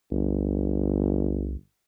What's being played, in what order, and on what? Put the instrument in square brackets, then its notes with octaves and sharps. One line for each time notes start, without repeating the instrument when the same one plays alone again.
[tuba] G1 [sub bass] C2